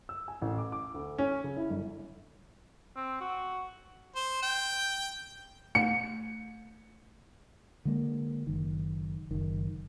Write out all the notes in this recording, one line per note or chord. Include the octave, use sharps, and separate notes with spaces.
E6
G#5
A1
D6
D6
D2
C#4
C#3
E4
G1
C4
F#4
C5
G5
A3 C#7
D3 G#3 A#3
F#1 D#3
F#1 D#3